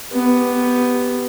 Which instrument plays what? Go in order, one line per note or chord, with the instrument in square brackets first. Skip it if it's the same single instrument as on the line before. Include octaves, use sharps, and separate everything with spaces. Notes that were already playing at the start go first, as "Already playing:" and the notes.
[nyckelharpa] B3 G4